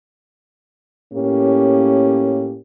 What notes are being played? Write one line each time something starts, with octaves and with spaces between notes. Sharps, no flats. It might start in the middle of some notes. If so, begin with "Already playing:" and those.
A2 A#3 C#4 G4